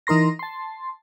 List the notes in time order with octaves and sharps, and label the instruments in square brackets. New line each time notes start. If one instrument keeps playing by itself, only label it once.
[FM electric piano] E3 D#4 A#4 C6 A#6
A5 C6